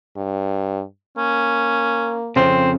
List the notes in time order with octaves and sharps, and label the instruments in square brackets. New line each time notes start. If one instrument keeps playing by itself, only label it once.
[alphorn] G2
[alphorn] A#3 [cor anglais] C#4
[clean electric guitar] F2 C#3 [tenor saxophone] C4